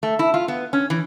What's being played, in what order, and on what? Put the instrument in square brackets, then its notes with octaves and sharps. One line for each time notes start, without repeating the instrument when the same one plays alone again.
[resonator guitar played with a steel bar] A3
E4
F4
B3
C#4
E3